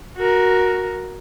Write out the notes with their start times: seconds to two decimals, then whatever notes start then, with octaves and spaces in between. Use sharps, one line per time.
0.17 F#4 A#4